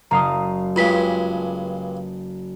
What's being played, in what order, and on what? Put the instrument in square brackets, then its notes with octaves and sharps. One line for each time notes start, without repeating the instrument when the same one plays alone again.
[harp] F#1 F5 D#6 [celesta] A#5
[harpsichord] C#2 G2 G#3 [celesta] F4 B6